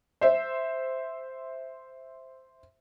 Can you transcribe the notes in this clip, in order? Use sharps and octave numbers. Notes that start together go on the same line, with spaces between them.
C5 E5